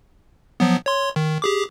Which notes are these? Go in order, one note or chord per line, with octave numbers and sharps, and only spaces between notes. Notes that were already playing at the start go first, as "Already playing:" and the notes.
F3 F#3 B3
C#5 C6
D#3
G4 G#4 D6